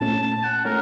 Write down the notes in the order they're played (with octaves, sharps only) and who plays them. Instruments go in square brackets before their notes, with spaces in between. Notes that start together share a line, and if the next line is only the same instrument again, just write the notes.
[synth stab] A#2 A3 C#4 [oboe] A5
[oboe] A5
F#5
[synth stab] A#2 A3 C#4 [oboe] A#4